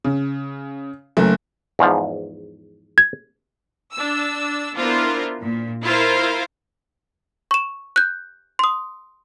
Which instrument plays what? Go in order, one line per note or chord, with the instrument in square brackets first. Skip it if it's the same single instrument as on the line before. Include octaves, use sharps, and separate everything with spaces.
[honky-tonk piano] C#3
F#1 F#2 A3
[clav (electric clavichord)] E2 G#2 F3
[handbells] G#6
[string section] D4 E6
B3 D4 E4 F4 A#4 C5
A#2
E4 F4 A#4 C5 F5
[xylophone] C#6 E7
F#6 G6
C6 D#6